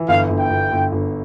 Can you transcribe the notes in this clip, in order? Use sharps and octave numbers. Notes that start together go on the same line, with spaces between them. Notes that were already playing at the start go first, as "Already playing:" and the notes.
Already playing: E3
G1 F5
G1
G5
G1
G1
G1